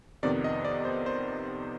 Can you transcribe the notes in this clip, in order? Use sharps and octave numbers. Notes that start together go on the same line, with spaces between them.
F2 C3 D#3 B3 D5
D#5
D5
C5
C5